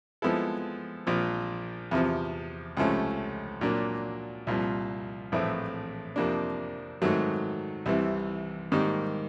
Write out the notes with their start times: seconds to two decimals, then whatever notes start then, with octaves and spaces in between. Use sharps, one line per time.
0.22 F3 G#3 B3 E4 A4
1.07 A#1 A#2 F3
1.91 E2 C3 F3
2.77 C#2 C3 F3 A3 C#4
3.61 A#2 F#3 A#3 D4
4.47 C2 A#2 F3
5.32 A#1 A2 E3 A3 C4
6.16 F2 C3 F3 A#3 D4
7.02 G#2 D#3 F#3 A3
7.86 C2 C3 E3
8.72 G#2 D#3 G3 A#3